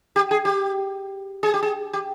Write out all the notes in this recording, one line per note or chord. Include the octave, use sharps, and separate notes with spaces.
G4
G#4
G4
G#4
G4
G#4
G4